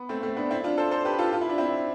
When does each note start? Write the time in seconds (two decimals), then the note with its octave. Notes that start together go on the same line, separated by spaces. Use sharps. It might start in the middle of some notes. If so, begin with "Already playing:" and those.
Already playing: B3
0.09 A3 C4
0.23 A3 C4
0.36 B3 D4
0.51 C4 E4
0.64 D4 F4
0.78 A4 C5
0.91 A4 C5
1.05 G4 B4
1.18 F4 A4
1.33 F4
1.41 E4
1.49 D4
1.58 C4 E4